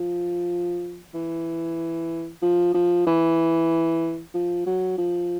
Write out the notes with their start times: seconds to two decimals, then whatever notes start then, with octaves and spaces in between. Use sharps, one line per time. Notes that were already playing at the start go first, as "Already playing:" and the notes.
Already playing: F3
1.14 E3
2.42 F3
2.74 F3
3.06 E3
4.34 F3
4.66 F#3
4.98 F3